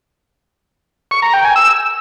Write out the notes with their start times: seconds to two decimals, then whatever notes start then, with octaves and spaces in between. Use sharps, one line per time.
1.11 C#6
1.22 A#5
1.33 G5
1.45 G#5
1.56 E6